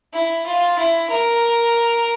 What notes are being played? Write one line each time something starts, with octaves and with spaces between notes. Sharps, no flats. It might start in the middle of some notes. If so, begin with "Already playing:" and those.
E4
F4
E4
A#4